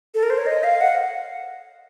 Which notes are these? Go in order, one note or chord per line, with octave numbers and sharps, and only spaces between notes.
A4
A#4
C5
C#5
D#5
F5
F#5